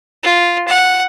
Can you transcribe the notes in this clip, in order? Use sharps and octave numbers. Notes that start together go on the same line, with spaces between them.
F4
F#5